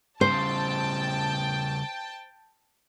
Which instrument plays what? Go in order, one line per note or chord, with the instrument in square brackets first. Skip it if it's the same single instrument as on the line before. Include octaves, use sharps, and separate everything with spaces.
[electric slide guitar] C#3 G3 [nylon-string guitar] C5 [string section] G5 A5